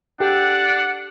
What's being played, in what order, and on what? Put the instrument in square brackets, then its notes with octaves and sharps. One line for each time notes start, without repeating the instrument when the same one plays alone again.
[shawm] D4 [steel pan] G4 A4 G5 [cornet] F#5